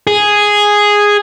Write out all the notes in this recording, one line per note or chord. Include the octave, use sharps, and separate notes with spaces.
G#4